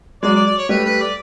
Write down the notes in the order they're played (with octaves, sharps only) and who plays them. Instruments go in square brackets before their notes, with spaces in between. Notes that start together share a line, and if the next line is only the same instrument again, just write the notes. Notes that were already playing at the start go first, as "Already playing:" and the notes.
[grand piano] F#3 G#3 [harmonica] D5
[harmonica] D5
D5
C#5
[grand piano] G3 A3 [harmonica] B4
[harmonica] B4
D5